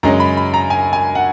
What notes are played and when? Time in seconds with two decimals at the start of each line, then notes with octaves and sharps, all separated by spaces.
0.03 F#2 C#3 G#3 C#4 A#5
0.20 B5
0.37 B5
0.54 A#5
0.70 G#5
0.93 G#5
1.15 F#5